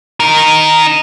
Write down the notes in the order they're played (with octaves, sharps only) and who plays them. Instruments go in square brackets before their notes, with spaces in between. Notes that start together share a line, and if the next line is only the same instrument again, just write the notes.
[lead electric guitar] D#4 A#4